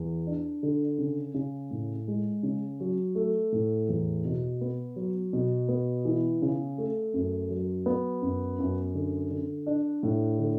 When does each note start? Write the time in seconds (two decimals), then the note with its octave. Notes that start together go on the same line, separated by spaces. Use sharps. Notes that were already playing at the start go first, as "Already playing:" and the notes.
Already playing: E2
0.27 D4
0.63 D3
0.98 C#3
1.34 C#3
1.71 A2
2.08 G#3
2.43 C#3
2.80 F#3
3.15 A3
3.52 A2
3.89 E2
4.25 B2
4.61 B3
4.96 F#3
5.33 B2
5.69 B3
6.05 E3
6.42 C#3
6.78 A3
7.14 F#2
7.50 F#3
7.86 B3
8.22 F#2
8.59 F#2
8.94 D3
9.31 D3
9.67 D4
10.03 A2
10.39 D3